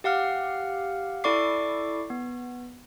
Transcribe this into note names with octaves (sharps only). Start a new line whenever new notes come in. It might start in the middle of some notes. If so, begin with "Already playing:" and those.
G4 F5 F#5 F6
E4 A4 D5 C#6 D6 C7
B3